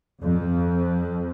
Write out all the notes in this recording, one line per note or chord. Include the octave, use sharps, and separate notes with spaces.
F2